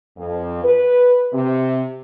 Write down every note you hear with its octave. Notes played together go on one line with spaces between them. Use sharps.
F2
B4
C3